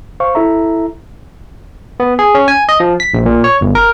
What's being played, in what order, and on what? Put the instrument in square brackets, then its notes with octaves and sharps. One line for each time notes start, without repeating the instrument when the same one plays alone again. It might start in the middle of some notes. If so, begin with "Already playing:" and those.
[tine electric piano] C5 F5 C#6
E4 A4 E5 A#5
B3
G#4
C#4
G#5
D#5
F3
B6
A#1
A#2
C#5
G1
A#4